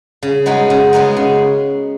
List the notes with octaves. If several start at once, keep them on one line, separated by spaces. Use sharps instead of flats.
C#3
G#3 B3 D#4 F#4
C#3
G#3 B3 D#4 F#4
C#3